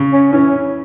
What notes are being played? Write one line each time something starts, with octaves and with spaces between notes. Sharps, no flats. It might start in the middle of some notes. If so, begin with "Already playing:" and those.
Already playing: C#3
C#4
E3 C#4